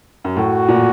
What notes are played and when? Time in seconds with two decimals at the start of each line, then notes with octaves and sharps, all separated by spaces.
0.25 F#2
0.36 A2 F#4
0.68 A#2